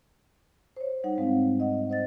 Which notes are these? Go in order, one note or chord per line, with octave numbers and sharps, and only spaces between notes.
C5 C#5
G3 D#4 F#5
G#2 G#3 C4 F5
D#5 F#5
C5 D#5 A6